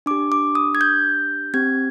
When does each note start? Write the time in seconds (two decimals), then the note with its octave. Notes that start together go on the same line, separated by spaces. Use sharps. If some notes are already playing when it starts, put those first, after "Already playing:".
0.06 D4 G4 D6
0.32 D6
0.55 D#6
0.75 G#6
0.81 G6
1.54 C4 G4 G#6